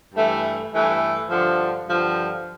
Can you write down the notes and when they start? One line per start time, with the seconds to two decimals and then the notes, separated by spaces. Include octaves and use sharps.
0.14 G2 E3 A3
0.72 G2 E3 A3
1.29 G2 D3 F3
1.87 G2 D3 F3